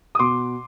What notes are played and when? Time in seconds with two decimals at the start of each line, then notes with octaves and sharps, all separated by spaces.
0.15 D#6
0.19 B2 C6 D6